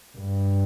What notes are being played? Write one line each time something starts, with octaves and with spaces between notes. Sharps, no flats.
G2